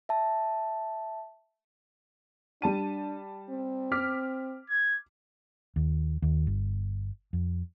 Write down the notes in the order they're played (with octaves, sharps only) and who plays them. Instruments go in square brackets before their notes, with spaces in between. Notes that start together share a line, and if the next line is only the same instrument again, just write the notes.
[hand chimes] E5 A5
[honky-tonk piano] G3 A5 D#7 [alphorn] D4
[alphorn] C4
[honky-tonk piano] D6 F6 B6
[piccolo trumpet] G#6
[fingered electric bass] D#2
D#2
G1
F2